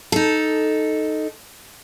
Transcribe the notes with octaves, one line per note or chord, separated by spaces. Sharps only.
D#4 A4